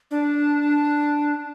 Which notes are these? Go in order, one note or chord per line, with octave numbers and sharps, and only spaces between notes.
D4